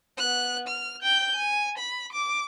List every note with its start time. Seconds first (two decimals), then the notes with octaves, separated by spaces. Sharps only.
0.18 B3 F#6
0.68 F6
1.03 G5 G6
1.36 G#5
1.78 B5
2.13 D6